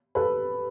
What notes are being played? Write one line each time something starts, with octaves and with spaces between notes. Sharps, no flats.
A4 B4